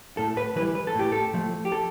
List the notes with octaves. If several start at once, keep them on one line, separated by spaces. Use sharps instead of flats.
A2 A4
B4
E3 G3 B4
B4
A4
A2 G4
A4
F3 A3
G4
A4